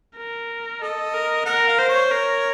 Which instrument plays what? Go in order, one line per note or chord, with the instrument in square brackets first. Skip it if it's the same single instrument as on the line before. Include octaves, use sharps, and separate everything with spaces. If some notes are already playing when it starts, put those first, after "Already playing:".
[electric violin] A#4
[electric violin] A4 [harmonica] D#5
[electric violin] A#4
[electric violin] A#4 [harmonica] F#5
[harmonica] F5
[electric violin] C5
[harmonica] C#5
[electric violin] A#4